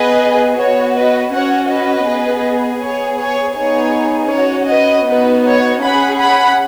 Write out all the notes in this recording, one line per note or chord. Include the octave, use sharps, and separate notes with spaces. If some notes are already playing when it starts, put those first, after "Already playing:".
Already playing: B3 G#4 B4 D#5
B3 F#4 C#5
B4 D#5
C#4 F#4 C#5 F#5
B4 D#5
B3 G#4
B3 G#4 C#5
C#5
B3 D#4 G#4 C#5
C#4 F#4 C#5
B4 D#5
B3 D#4 F#4 B4
C#5
C#4 G#4 F#5 B5
F#5 B5